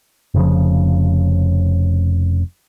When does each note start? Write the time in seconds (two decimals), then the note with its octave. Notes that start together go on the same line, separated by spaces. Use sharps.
0.34 F1 C#3 F3